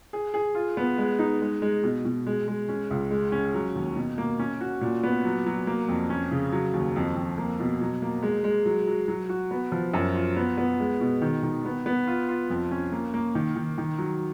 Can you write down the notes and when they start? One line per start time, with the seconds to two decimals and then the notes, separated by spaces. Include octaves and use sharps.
0.13 G#4
0.34 G#4
0.55 F4
0.77 B3
0.98 G#3
1.19 D#4
1.41 G#3
1.62 G#3
1.83 B2
2.05 B2
2.27 G#3
2.48 G#3
2.69 C#4
2.91 C#2
3.11 G#3
3.32 C#4
3.54 F#3
3.76 D#2
3.96 B2
4.18 A#3
4.39 C#4
4.61 F#4
4.81 A#2
5.04 B3
5.25 F#3
5.46 F#3
5.67 A#3
5.88 F2
6.10 C#4
6.31 C#3
6.52 F#3
6.73 D#2
6.96 F2
7.16 F2
7.38 A#3
7.60 B2
7.81 F#3
8.02 A#3
8.22 G#3
8.44 G#3
8.66 F#3
8.88 F#3
9.08 F#3
9.29 F#4
9.51 B3
9.72 F3
9.94 F#2
10.15 F4
10.36 B3
10.58 B3
10.80 G#3
11.01 B2
11.22 D#3
11.43 D#3
11.65 B3
11.86 B3
12.07 F4
12.29 F4
12.50 F2
12.71 C#4
12.92 A#3
13.14 A#3
13.35 D#3
13.56 D#3
13.78 D#3
13.98 F#3